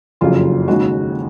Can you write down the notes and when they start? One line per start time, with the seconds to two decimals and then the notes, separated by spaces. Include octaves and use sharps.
0.21 F#1 F2 C#3 F#3 F4
0.68 D#2 C#3 G#3 F#4